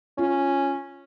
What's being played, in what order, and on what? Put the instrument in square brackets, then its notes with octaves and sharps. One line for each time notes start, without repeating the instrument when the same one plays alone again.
[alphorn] C#4 [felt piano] F4